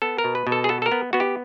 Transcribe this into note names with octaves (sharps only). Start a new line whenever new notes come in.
B3 A4
A#4
B2
B4
B2
A4
G#4
B3 A4
A4
A#4
B3
B3 F#4
G4